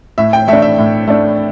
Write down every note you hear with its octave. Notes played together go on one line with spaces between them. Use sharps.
A2 E5
G5
A3 D4 E5
E5
A2
A3 D4